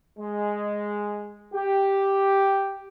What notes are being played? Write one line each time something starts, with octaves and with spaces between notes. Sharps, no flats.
G#3
G4